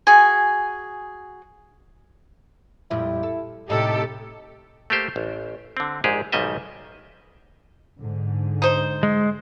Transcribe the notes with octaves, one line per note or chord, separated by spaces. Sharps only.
F#4 G#4 G#5
F2 A#2 G3 E4
A4
A2 C3 D#4 G4 A4
A3 A#3 G4 C5
A1
D3 C4
A#1 G#2 G#3 G4 G#4
B1 G#2 D#3 G3 D#5 E5
G#2 D3
D#4 C5
G#3